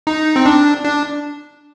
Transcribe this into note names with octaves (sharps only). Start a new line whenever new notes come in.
D#4
C4
D4
D4